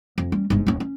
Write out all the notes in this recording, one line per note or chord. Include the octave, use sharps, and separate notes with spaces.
F2
G3 C#4
G1 G#2
D#1 C#4
C#4